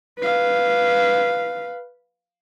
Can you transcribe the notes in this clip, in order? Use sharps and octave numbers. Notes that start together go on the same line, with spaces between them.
B4 F5